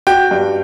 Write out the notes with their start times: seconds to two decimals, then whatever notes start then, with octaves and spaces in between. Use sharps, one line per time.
0.07 F#4 G5
0.31 G2